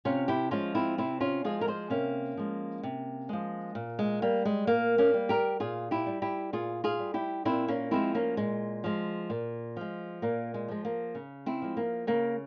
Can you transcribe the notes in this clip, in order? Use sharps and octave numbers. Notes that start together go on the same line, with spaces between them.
C3 C#4 F4
E4 G4
F3 G#3 C#4 F4
C4 E4
C3 C4 E4
C#4 F4
F3 G#3 F4 G#4
A#4
G#4 C5
C3 A#3 C#4
F3 G#3
C3
F3 G#3
A#2
G#3
G3 A#3
G#3
A#2 A#3
A#3 C#4
G3
G4 A#4
A#2 F4 G#4
E4 G4
G3
E4 G4
A#2 F4 G#4
F4 G#4
G3
E4 G4
A#2 C4 E4
A#3 C#4
F3 G#3 C4 E4
A#3 C#4
A#2 G#3
F3 G#3
A#2
F3 G#3
A#2 A#3
G#3
F3 G#3
A#3
C#3
C4 E4
F3 G#3
A#3
C#3 A#3